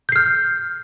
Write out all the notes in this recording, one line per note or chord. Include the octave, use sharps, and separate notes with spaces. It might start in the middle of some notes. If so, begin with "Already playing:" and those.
F6 G6 C7